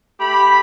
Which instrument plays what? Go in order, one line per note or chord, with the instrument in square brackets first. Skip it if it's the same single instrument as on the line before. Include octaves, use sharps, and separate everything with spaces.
[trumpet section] A3 G4 B5